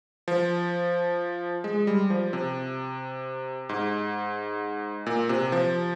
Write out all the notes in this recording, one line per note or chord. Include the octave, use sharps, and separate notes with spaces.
F3
G#3
G3
F3
C3
G#2
A#2
C3
F3